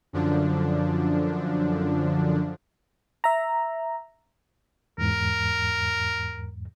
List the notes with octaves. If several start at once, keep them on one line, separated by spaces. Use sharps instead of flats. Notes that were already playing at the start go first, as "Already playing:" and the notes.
F#2 D3 F3 D4
E5 A#5
E2 G#2 A#4